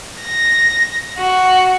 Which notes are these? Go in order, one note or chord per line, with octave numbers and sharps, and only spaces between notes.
A#6
F#4